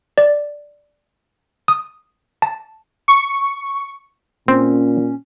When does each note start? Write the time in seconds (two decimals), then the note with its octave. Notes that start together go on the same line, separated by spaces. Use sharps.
0.18 D5
1.68 D#6
2.42 A5
3.08 C#6
4.48 A#2 C4 C#4